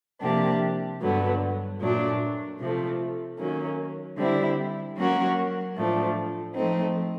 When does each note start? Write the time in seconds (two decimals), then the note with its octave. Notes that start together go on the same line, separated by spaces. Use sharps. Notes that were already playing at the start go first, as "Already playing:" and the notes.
0.22 C3 F3 A#3 D4 G4
1.01 G2 D3 F#3 B3
1.81 A#2 F#3 A3 D4
2.59 C3 F3 A3
3.39 D#3 F#3 A#3 C#4
4.18 D3 G3 C4 E4
4.97 F#3 A#3 C#4 F#4 A#4
5.75 A2 F3 A3 D4
6.55 F3 A3 C4 D#4